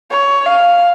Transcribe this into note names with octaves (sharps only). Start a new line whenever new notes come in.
C#5
F5